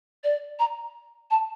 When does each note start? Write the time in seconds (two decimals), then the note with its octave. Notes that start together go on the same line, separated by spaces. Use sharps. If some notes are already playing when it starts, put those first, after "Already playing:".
0.24 D5
0.59 A#5
1.31 A5